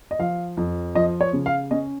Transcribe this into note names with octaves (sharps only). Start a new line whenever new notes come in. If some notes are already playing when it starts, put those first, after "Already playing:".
D#5
F3 F5
F2
F3 D#5
C#5
C#3
F5
C#4 D#5